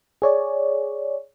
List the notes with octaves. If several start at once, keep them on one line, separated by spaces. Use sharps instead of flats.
G#4 C#5 D5